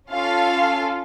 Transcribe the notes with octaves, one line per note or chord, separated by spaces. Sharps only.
C#4 F4 A4 F5